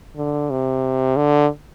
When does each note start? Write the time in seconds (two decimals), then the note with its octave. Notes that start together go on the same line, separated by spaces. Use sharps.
0.16 D3
0.50 C3
1.17 D3